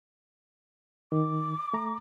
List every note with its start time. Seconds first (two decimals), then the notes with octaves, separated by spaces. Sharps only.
1.12 D#3 D6
1.74 A3 A#5